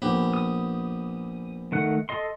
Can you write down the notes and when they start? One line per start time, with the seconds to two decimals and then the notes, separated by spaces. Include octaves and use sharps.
0.02 A#1 B3 G4
0.34 D#6
1.72 D#3 A3 F#5
2.09 A4 D#5 C6